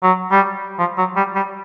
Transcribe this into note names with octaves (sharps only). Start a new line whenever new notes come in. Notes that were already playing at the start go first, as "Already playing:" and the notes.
F#3
G3
F3
F#3
G3
G3